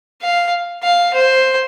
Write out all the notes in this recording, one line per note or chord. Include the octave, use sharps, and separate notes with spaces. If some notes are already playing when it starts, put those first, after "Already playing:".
F5
F5
C5